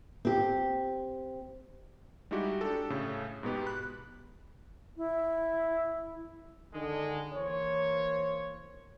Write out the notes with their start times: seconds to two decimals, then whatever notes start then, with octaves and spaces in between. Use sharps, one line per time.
0.25 C4 G4
2.31 G3 G#3 D#4 E4 F#4 G4
2.61 D4 G4 A4
2.90 A2 C#3 A4
3.43 G#2 B2 B3 G4
3.66 B5 F#6
4.97 E4
6.74 D3 D#3 G#3
7.34 E3 A#3 C5 C#5